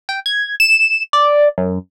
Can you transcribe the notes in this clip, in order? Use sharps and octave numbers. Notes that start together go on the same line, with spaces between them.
G5
G#6
E7
D5
F#2